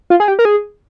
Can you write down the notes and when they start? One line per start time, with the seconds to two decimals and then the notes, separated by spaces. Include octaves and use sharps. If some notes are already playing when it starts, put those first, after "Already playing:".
0.10 F4
0.20 G#4
0.28 G4
0.39 A#4
0.45 G#4